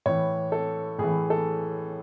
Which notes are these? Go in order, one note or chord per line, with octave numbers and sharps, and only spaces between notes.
A2 E3 C#5
A4
A2 E3 G#4
A4